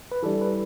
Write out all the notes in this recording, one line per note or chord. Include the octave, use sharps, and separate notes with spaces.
B4
E3 G3 D4 A4
B4